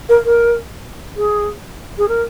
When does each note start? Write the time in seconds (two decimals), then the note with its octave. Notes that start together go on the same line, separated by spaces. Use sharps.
0.09 A#4
0.24 A#4
1.17 G#4
1.98 G#4
2.08 A#4